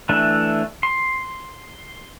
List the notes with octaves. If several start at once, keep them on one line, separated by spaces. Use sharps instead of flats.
E3 A3 D4
C6